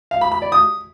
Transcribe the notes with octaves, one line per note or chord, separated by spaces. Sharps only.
F5
B5
B5
D5
D#6